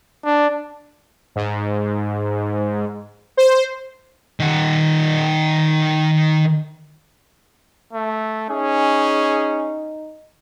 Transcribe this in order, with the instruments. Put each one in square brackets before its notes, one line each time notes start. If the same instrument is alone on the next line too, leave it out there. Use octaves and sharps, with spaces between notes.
[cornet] D4
[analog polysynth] G#2
C5
[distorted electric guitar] D#3 F#5
[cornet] A3
[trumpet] C#4 [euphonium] D#4 [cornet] G#4